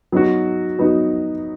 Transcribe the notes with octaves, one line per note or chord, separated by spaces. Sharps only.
F#3 B3 D#4 F#4
F#3 B3 D#4 F#4